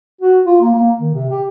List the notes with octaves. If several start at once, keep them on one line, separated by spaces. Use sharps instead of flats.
F#4
F4
A#3
A#3
D#3
C3
G4